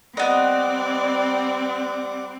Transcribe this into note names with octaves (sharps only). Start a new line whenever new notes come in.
G3 B3 C4 D5 D#5 F#5 D6